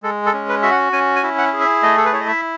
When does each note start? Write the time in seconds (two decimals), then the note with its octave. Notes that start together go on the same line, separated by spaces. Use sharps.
0.03 G#3 A4
0.26 A4
0.33 C#4
0.49 B4
0.62 F#4 E5
0.71 F#5
0.93 C#4 G#5
1.16 G#5
1.23 E4
1.38 F#5
1.53 G#4
1.60 E5
1.83 A3 D#5
1.98 A4
2.05 B4
2.13 E4 C#5
2.20 D#5
2.28 E5